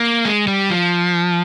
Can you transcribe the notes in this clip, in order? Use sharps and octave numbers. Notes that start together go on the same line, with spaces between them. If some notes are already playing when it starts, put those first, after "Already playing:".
Already playing: A#3
G#3
G3
F3